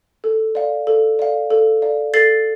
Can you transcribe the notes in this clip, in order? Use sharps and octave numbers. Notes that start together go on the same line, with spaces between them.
A4
D5 F5
A4
D5 F5
A4
D5 F5
A4 A6 C7